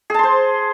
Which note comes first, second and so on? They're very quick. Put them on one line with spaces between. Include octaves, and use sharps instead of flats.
G#4 A5 C6 C5